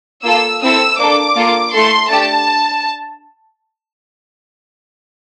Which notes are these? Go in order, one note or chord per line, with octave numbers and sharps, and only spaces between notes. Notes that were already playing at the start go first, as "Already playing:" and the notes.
A#3 F4 A4 E6
C4 E4 A4 E6
A#3 D4 A4 D6
A#3 F4 A4
A3 E4 A4 C6
A3 D4 G4 A5